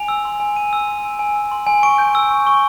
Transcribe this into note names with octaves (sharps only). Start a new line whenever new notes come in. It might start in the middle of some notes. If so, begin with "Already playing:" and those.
Already playing: G#5 F7
E6
C6
G#5
G#5 D#7
E6
C6
G#5
G#5
E6
C6
G#5
C#6 D7
G6
E6
C#6
C#6